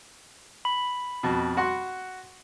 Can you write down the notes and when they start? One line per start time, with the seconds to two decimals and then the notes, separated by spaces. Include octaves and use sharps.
0.65 B5
1.23 F2 B2
1.57 F#4 F#5 C6